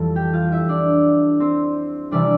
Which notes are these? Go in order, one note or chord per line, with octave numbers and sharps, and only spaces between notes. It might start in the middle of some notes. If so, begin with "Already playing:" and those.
Already playing: F2 E3 G3 A4 A5
G4 G5
F4 F5
E4 E5
D4 D5
C4 C5
C3 E3 G3 D4 D5